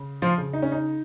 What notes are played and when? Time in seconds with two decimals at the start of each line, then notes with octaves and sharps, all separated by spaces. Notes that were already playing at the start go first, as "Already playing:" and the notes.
Already playing: C#3
0.22 F3 F4
0.38 C#3
0.53 D#4
0.62 C#4
0.72 D#4